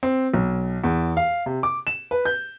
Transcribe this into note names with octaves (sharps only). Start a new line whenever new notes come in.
C4
B1
E2
F5
C3
D6
E7
B4
G6